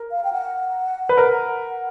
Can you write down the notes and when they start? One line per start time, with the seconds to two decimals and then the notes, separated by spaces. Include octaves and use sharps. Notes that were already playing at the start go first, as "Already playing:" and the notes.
Already playing: A#4
0.11 F5
0.24 G5
0.33 F#5
1.09 B4
1.17 A#4 F#5